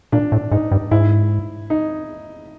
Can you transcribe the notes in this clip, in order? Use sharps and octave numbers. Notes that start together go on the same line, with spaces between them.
A#2 D4
A2
G#2 D#4
G2
G#2 E4
D#4